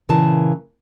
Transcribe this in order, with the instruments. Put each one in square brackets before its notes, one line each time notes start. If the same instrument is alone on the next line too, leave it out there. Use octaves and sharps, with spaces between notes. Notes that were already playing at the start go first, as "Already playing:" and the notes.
[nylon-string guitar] A#2 C#3 E3 A#4 A5